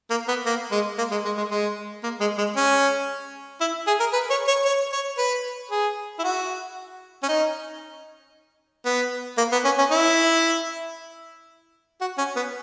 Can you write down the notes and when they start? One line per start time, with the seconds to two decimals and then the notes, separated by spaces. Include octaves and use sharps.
0.11 A#3
0.28 B3
0.46 A#3
0.71 G#3
0.98 A#3
1.12 G#3
1.25 G#3
1.38 G#3
1.51 G#3
2.03 A#3
2.20 G#3
2.38 G#3
2.56 C#4
3.61 E4
3.87 G#4
4.00 A#4
4.13 B4
4.30 C#5
4.48 C#5
4.65 C#5
4.92 C#5
5.18 B4
5.71 G#4
6.19 E4
6.24 F#4
7.23 C#4
7.29 D#4
8.85 B3
9.38 A#3
9.52 B3
9.65 C#4
9.78 C#4
9.91 E4
12.01 F#4
12.18 C#4
12.36 B3